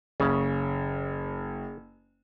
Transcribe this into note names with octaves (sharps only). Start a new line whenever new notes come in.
F#1 C#3